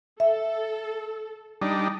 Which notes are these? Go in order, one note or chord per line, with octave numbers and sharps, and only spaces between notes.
A4 E5
G3 D4 D#4